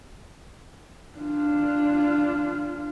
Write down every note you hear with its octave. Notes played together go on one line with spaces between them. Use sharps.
D4 F4